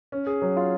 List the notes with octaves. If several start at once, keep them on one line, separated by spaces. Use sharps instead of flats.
C#4
G#4
F#3
F4